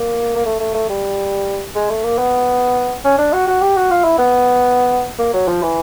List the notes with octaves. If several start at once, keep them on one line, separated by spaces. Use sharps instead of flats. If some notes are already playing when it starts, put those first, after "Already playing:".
Already playing: A#3
A#3
A3
A3
A3
G3
G#3
A3
A#3
B3
C#4
D4
F#4
F#4
G4
F#4
F4
E4
B3
A#3
F#3
F3
E3